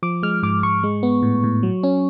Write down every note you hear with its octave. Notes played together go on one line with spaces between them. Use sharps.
F3 D6
G#3 F6
G#2 D6
G#2 C#6
G#3
B3
A2
A2
F#3
C#4